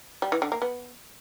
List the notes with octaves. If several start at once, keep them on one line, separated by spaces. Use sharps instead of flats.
G3
E3
D3
A#3
B3